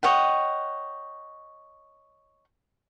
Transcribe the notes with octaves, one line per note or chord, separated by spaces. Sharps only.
C#5 D#5 F#5 G5